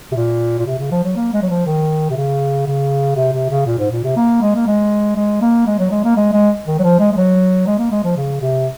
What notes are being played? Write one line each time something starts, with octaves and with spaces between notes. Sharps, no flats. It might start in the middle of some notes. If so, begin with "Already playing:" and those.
C3
A#2
A#2
C3
C#3
F3
F#3
A#3
G#3
F#3
F3
D#3
C3
C#3
C#3
C3
C3
C#3
A#2
G#2
A#2
C3
A#3
G#3
A#3
G#3
G#3
A#3
G#3
F#3
G#3
A#3
G#3
G#3
D#3
F#3
F3
G#3
G#3
F#3
G#3
A#3
G#3
F3
C#3
C3